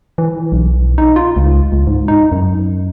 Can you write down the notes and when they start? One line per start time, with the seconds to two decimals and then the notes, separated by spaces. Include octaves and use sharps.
0.18 E3
0.52 B1
0.98 D#4
1.16 F4
1.36 C#2
1.72 C#2
1.87 G#2
2.08 D#4
2.32 F#2